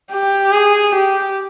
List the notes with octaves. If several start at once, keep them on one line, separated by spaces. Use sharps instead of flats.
G4
G#4
G4